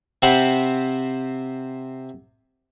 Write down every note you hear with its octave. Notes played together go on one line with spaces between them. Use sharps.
C3 C4 F#5 B5